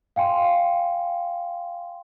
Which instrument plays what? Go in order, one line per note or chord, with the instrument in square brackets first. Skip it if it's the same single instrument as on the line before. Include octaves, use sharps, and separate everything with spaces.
[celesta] F5 G5 G#5 C6